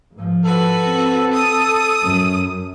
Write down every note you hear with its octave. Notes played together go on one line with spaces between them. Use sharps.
G#2 F3
F#4 A4 B4
C4
D#6 D#7
F#2